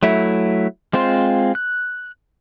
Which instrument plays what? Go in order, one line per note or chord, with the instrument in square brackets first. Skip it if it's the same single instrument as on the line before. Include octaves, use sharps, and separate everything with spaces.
[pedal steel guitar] F#3 A3 E4
G#3 C4 F4 C5
F#6